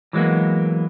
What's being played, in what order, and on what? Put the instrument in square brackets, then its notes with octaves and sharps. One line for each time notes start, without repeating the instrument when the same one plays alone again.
[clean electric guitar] E3 F#3 G#3 A#3 B3